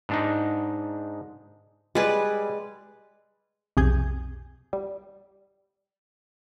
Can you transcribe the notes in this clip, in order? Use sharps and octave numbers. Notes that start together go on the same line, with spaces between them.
G#2 D4 D#4
G3 G#3 B4 D5 G#5
B1 F2 C3 G#4 G6 G#6
G3